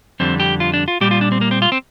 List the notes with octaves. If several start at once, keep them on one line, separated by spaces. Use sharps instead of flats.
F2 D3 G3 C4
G4
F4
D4
F4
A#2 G3 G4
F4
D4
C4
A#3
C4
F4
C4